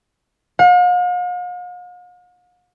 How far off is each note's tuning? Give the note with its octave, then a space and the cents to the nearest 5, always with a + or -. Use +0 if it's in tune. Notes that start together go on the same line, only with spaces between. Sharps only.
F5 +45